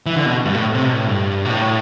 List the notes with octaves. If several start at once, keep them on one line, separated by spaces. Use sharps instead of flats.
E3
D3
B2
G2
A2
C3
B2
A2
G2
B2
A2